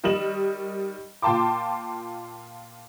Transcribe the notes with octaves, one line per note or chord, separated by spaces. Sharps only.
D#3 G3 D#5 E7 F#7
A#2 F4 G5 A5 C6 D6